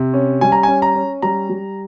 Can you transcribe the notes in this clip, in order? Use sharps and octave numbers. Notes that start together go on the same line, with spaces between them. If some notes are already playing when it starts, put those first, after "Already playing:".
Already playing: C3
C#4
G3 G#5
A#5
C#4 G#5
A#5
C#4
G3 A#5
G3